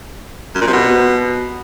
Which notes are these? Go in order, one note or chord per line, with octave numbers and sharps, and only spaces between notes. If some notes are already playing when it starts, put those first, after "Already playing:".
F#2
A#2
C3
B2